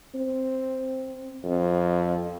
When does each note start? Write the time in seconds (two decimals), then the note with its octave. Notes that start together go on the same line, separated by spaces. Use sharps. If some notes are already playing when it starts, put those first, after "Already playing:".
0.14 C4
1.44 F2